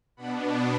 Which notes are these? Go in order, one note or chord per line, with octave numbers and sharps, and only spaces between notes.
B2 B3 D4 F#5 B5